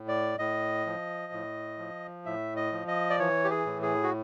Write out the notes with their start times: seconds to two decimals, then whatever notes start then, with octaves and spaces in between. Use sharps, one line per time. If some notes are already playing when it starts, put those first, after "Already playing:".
Already playing: A2
0.08 D5
0.39 A2 D#5
0.86 F3
1.33 A2
1.79 F3
2.26 A2 E5
2.57 D#5
2.72 F3
2.88 D#5
3.10 D5
3.19 E3 C#5
3.45 G4
3.51 G#4
3.66 A2
3.82 G#4
4.03 F#4